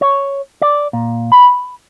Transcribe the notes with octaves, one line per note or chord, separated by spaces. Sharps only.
C#5
D5
A#2
B5